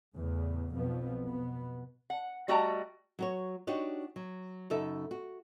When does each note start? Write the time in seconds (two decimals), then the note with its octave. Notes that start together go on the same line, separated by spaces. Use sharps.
0.16 E2 A2 C#3
0.74 B1 F2 B2 F3 B3
1.26 B2 B3
2.10 F#5
2.48 G3 A3 F#4 D#5 G5 A#5
3.19 F#3 F#4 C#5
3.67 D4 D#4 F#4 G4 C#5
4.16 F#3
4.70 F#2 C#3 D#4 A4 E5
5.11 F#4